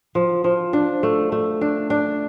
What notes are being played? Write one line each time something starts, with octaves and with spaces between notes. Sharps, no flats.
F3
F3
D4
A3
A3
D4
D4